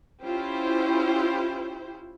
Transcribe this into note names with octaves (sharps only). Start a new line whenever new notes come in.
C#4 E4 F4 G4 C5